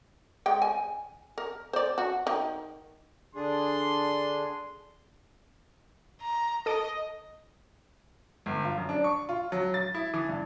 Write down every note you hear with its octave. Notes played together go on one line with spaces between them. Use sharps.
G#3 G5
G#5
A#4
C5 D5
F#4
D#3
D3 D4 G#4 C6
A#5
A4 D#5 D6
G1
F4
F#2
D4
C#6
F4
F#3
A6
E4
E3
G2